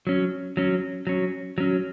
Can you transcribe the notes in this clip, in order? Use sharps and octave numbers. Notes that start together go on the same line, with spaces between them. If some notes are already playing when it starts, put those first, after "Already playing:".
F#3 C#4
F#3 C#4
F#3 C#4
F#3 C#4